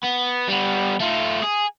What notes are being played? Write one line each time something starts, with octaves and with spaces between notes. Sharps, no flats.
B3
G3 B3
A3 F4
G#4